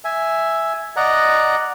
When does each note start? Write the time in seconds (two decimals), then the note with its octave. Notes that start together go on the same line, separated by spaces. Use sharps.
0.05 E5 G#5
0.96 D5 D#5 F#5 A#5